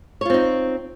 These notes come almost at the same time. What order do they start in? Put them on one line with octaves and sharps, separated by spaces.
C#5 F4 C4 D#4